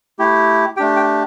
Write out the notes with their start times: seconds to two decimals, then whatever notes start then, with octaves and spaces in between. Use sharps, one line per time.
0.19 A3 E4 G4
0.77 G4 G5
0.80 A3 D4
0.96 G5